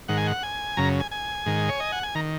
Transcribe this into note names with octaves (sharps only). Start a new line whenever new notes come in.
G#2 D#3 F#5
G#5
F#5
G#5
F#2 C#3 A#5
G#5
G#5
G#2 D#3
C#5
D#5
F#5
G#5
D#3 A#5